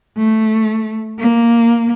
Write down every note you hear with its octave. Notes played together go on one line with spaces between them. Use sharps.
A3
A#3